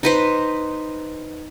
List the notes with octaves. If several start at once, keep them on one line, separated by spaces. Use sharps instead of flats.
D#4 B4 C5